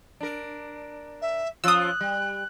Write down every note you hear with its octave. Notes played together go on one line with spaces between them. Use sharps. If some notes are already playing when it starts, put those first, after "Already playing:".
D4 A#4
E5
F3 C#4 F4 D#6 E6 F#6
G3